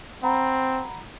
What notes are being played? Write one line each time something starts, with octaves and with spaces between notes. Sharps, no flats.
C4 F#5 A#5 B5